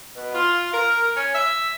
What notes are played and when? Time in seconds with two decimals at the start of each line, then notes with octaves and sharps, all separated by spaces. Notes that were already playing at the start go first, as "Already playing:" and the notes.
0.16 B2
0.34 F4
0.74 A#4
1.17 C#4
1.35 E5